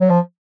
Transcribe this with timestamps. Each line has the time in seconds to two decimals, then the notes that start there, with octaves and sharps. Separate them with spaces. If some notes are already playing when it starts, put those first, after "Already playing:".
0.01 F#3
0.10 F3